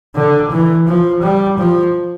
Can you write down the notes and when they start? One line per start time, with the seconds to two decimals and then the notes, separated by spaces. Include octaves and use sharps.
0.15 D3
0.51 E3
0.87 F3
1.22 G3
1.58 F3